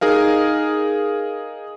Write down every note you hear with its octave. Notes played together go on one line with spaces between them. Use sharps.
D#4 G#4 A#4 F5